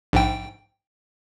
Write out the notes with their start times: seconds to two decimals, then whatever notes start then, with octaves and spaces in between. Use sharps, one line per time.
0.13 A#1 G#2 G5